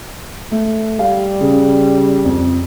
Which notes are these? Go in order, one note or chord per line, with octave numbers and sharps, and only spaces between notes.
A3
G3 F5
C#3
F2